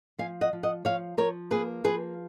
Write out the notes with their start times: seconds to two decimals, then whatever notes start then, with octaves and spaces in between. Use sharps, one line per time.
0.18 F3 F5 G#5
0.41 D#5 F#5
0.53 F3
0.63 D#5 F#5
0.85 F3 C#5 F5
1.17 F3 A#4 C#5
1.51 A#3 G#4 B4
1.84 F3 G#4 B4